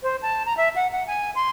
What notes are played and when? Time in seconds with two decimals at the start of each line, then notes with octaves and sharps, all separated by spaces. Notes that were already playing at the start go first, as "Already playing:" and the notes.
0.03 C5
0.22 A5
0.46 A#5
0.57 E5
0.76 F#5
0.92 F#5
1.07 G#5
1.35 C6